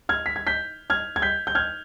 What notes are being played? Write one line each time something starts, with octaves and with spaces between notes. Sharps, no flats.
F6 G#6
B6
G#6
G6 B6
F6 G#6
G#6
G6 B6
G6
F6 G#6